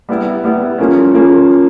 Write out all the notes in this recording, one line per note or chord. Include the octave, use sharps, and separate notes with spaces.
G3 B3 E4
G3 B3 E4
F3 A#3 C#4
F3 A#3 C#4